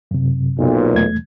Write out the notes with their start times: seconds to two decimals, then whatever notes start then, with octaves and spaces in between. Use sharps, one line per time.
0.11 F#2 C3
0.59 B1 A#2
0.93 E2 A3 G#6